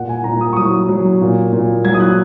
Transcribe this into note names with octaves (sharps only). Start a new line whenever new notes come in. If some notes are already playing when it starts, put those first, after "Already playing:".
Already playing: A#2 F#5
G#5
A#2 A#5
D#6
C#6
F#3 D#6
F#3
A#2
A#2
F#3 G#6
D#6
F#6